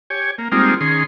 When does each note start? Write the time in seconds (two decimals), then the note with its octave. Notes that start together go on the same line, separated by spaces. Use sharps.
0.10 G4 C#5 G#5
0.38 A#3
0.52 G3 G#3 A#3 C4 D#4 F4
0.81 D#3 C#4 G#4 C6